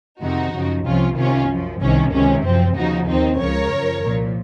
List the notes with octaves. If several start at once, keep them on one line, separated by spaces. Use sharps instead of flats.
F2 C3 D#3 D#4 F#4
F#2 C#3 F3
C2 C3 F3 C#4 F4
C2 C3 D#3 C#4 F4
F#2 F3
C2 C3 D#3 C#4
C#2 C3 D#3 C#4
F#2 F3 C4
D#2 C#3 F3 D#4 F#4
D#2 D#3 C4 D#4
C#2 C#3 F3 A#4 C#5
F#2 F3
C2 A#2 F3